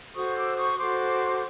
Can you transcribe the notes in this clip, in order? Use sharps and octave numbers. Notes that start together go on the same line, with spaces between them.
F#4 A4 C5 C#6 D#6
D6 E6
C#6 D#6
F#4 A4 C5 C6 D6